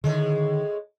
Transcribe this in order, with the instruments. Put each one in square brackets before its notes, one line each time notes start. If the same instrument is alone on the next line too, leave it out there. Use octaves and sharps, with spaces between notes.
[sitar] A2 G#3 [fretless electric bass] D3 D#3